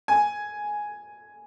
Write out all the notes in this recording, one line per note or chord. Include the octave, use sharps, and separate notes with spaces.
G#5